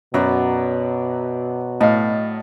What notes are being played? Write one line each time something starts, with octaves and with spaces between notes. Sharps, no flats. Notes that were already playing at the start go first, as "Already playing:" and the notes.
F#2 B2 F#3 B3 D5
A2 D#5 F5 A5